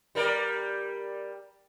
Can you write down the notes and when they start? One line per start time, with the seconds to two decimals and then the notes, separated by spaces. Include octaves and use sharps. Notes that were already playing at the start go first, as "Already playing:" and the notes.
0.15 G3 A#4 D5